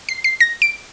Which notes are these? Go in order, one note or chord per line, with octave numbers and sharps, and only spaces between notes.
C7
C7
A#6
D7